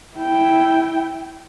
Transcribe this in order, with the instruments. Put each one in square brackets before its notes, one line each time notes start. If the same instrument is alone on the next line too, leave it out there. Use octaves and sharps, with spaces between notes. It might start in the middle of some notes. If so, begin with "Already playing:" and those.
[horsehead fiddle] E4 G5